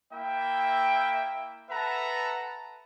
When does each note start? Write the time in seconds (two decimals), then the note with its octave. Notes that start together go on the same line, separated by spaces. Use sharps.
0.12 A#3 E4 E5 G5
1.70 A4 B4 E5 F#5 A5 A#5